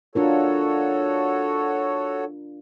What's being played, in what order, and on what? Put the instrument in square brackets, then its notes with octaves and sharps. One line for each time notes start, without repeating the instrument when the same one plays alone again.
[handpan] D4 F4 A#4 [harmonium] F#4 A4 C#5